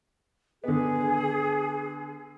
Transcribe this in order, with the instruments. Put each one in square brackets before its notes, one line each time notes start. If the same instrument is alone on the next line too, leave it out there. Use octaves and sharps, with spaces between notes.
[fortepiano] D3 B3 [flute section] G#4